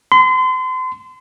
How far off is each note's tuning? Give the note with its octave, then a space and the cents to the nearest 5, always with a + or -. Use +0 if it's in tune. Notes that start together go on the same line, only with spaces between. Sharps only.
C6 -35